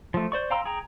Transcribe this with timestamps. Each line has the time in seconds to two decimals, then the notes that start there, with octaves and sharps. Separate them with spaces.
0.14 F3 A3
0.32 C5 D5 C#6
0.51 F5 G5 A#5 C6 E6
0.65 G#4 G5 G#5 A#5